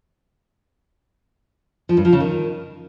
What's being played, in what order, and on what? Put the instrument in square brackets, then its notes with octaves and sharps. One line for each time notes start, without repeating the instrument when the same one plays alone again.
[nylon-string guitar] F3
G2
F3
C#3
D#3